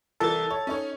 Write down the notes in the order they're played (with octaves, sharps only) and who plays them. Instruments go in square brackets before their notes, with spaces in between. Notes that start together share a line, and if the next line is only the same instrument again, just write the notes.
[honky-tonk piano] C2 E3 A#4 [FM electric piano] A4 A6
[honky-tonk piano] C#5
C#4 D#4 C#5